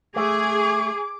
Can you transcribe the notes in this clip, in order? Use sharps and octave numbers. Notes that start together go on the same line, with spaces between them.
A3 G#4 D6